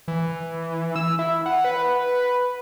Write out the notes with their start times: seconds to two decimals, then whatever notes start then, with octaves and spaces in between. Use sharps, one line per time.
0.08 E3
0.96 E6
1.19 E4
1.46 F#5
1.64 B4